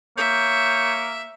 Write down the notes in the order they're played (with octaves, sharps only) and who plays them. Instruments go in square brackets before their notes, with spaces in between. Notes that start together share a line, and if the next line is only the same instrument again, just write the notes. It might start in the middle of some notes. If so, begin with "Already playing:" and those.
[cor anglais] A#3 [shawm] C#5 [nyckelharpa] E5 [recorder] G6